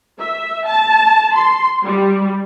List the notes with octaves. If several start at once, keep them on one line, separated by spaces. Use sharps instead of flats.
E5
A5
C6
G3